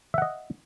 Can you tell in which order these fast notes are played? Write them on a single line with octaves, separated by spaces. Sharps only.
E5 F#5 D#5